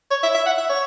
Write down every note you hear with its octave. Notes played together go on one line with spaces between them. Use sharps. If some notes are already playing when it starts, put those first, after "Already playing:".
C#5
E5
E5
F#5
E5
C#5